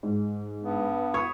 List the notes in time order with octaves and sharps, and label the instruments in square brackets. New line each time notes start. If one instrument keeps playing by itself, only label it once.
[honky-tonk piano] G#2
[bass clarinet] G2 [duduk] B3
[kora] C#5 [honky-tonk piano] B5 C#6 D#6